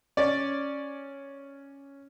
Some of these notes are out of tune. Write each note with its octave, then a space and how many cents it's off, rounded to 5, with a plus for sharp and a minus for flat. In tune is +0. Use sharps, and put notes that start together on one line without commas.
C#4 +0 D5 +0